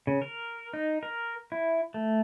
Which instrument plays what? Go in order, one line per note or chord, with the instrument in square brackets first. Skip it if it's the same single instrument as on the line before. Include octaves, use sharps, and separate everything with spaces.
[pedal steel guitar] C#3
A#4
D#4
A#4
E4
A3